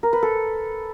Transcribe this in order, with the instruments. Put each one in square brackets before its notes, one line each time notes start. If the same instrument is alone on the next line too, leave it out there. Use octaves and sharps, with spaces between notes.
[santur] A#4
B4
A4